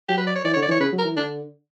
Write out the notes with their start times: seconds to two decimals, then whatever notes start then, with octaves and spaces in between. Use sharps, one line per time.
0.09 F#3 G4
0.18 B4
0.27 D5
0.36 C#5
0.45 E3 D5
0.53 C#5
0.56 D3
0.63 D5
0.69 E3 C#5
0.80 C#3 B4
0.93 F#3
0.98 A#4
1.05 E3
1.16 D3 D4